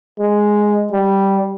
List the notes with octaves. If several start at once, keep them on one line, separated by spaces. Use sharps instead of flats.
G#3
G3